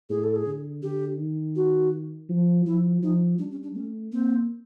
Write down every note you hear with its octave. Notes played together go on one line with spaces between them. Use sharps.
A2 G#4
A4
G#4
D3
D3 G4
D#3
F#4
F3
F3 E4
F3 D#4
G3 D4
C#4
D4
A3 C#4
A#3 C4